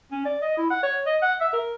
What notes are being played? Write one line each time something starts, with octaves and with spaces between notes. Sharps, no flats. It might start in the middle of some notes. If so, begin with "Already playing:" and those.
C#4
D5
D#5
E4
F#5
C#5
D#5
F#5
E5
A#4